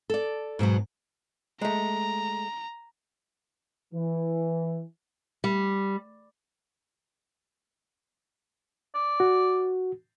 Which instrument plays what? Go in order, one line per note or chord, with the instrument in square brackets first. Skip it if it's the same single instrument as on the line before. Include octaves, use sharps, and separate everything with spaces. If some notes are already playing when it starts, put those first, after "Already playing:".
[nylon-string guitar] A4 D5
G#2 B2 E3 F#3
[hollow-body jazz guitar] G#3 A3 [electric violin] A#5
[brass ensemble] E3
[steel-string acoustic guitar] G3
[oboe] D5
[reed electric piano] F#4